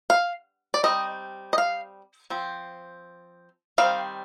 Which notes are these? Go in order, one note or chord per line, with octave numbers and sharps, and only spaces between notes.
F5
D5
G3 C4 D#4 D#5
D#5
F5
F3 C4
D#3 G3 C4 F5